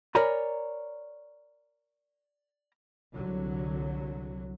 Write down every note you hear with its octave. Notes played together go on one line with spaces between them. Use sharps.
A#4 C#5 D5 G#5 A#5 B5
C2 D3 F#3